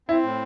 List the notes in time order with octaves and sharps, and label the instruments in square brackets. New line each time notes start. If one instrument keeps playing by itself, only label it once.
[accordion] C4 [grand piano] E4
[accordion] A2